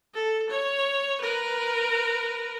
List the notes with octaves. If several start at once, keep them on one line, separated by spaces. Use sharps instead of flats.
A4
C#5
A#4 B4